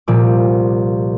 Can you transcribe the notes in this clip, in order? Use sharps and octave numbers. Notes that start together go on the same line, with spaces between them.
C2 A#2 F3 D6